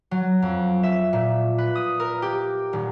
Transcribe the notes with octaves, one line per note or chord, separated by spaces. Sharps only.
F#3
F2
E5
A#2
B4
D#6
A#4
G4
D#1